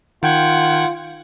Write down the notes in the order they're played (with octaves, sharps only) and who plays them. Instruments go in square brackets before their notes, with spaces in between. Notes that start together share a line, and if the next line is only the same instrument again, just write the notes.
[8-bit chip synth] D#3 G5 G#6 [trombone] F4 [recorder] F#5